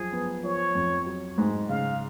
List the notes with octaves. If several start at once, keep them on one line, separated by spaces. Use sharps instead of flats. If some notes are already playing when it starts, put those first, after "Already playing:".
Already playing: F#2 F3 G#4
B3
F3 C#5
F2
F#3
G#2
C#3 F5